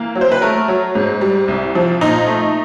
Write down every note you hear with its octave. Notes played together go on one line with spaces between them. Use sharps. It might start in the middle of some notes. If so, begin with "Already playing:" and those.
Already playing: E3 A#3
F#3
C5
B4
A3 A#4
F#3
G#2
G3
C2
F3
A#2 D#4
A3